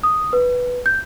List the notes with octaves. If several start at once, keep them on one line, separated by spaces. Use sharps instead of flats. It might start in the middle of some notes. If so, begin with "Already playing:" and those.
D#6
B4
G6